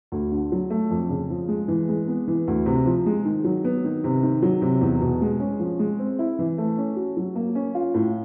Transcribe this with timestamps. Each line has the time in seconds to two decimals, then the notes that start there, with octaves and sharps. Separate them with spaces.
0.12 D2
0.32 D3
0.52 F#3
0.70 A3
0.91 F2
1.09 C#3
1.30 F3
1.49 G#3
1.68 E3
1.89 G#3
2.08 B3
2.28 E3
2.48 D2
2.66 C3
2.86 F3
3.06 G#3
3.25 D#3
3.44 F#3
3.64 B3
3.85 D#3
4.04 C3
4.23 D#3
4.42 F#3
4.62 C3
4.81 E2
5.01 B2
5.21 G#3
5.40 C#4
5.59 F3
5.79 G#3
5.99 C4
6.19 E4
6.39 E3
6.58 A3
6.78 C#4
6.96 F#4
7.17 F#3
7.35 A#3
7.55 C#4
7.75 F4
7.94 A2